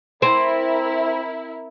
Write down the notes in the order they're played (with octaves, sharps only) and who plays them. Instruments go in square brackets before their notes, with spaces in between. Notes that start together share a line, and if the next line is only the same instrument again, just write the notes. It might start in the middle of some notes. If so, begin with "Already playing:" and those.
[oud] C4 [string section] E4 A#4